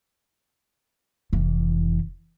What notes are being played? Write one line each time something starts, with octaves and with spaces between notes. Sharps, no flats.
F1 E3